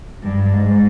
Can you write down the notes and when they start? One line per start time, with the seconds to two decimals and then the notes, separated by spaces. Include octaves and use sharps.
0.22 G2
0.53 G#2